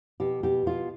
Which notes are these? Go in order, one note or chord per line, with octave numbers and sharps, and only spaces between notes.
B2 G4
B2 G4
B2 F4